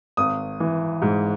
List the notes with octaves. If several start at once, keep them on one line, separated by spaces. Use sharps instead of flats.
G#1 D#6
E3
G#2